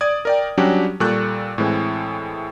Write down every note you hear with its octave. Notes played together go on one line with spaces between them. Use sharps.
D5 D#6 G#6
A#4 D5 G5
F#3 G3 C#4 D4 F#4 G4
A#2 G3 A4 C#6 F#6 G6
A2 E3 G#3 C4